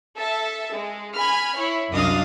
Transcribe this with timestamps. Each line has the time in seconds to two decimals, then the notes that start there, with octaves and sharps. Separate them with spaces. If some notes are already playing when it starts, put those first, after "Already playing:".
0.18 A4 E5 A5
0.73 G#3
1.15 G#5 B5 F6
1.56 E4 C#5
1.91 C2 F#2 D4 D#5 F5 D#6